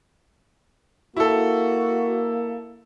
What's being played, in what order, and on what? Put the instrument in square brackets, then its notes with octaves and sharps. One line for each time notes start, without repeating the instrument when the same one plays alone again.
[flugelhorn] A#3 [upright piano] E4 A4 [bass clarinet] F#4